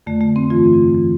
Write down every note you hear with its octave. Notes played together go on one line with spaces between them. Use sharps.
F2 D3 A3
A3
C4
G2 E3 F4
E3